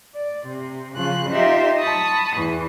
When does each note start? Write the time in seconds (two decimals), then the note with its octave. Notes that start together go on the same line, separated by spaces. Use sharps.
0.14 D5
0.47 C3
0.96 C#3 F3 F#6
1.30 D#4 F4 G4 C5 E5
1.78 A5 B5 C#6 D#6
2.34 E2 E3